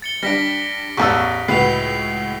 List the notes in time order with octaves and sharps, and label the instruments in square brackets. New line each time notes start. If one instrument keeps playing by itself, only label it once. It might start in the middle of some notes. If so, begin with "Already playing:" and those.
[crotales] A6 C#7 G7
[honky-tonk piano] G3 D4 [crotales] A#6 B6 D7
[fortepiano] A1 E2 E6 [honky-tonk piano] C#6
[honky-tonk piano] C#2 A2 F#4 [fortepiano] B4 [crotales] C7 F7